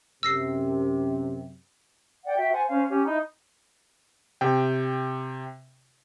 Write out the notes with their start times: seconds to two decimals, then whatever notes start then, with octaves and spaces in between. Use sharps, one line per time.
0.23 F#2 C3 E6 A#6 C7
2.24 D5 F#5 G5
2.37 F#4 E5 G5
2.52 C5 F#5 G#5 A5
2.68 C#4 C5 F5
2.89 C#4 G4
3.05 D#4 E4 A#5
4.41 C3 G5